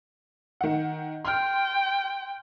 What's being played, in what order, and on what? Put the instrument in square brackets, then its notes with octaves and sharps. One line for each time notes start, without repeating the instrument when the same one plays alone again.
[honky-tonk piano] D#3 F#5
[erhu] G5 [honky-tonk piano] C6 F6